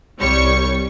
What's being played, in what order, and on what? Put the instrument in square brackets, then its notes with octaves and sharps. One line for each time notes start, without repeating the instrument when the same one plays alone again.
[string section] C2 G3 C#5 C#6